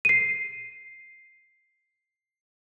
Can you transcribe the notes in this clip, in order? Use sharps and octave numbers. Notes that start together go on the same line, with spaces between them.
C7 D#7